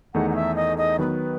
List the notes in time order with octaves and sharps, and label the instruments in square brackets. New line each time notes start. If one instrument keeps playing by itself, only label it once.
[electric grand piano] E2 D#3 A3 D#4 G#4 [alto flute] F#5
[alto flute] F#5
E5
D#5
D#5
[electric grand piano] D#3 F#3 B3 [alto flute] B4